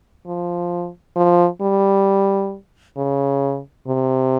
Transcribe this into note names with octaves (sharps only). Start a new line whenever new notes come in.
F3
F3
G3
C#3
C3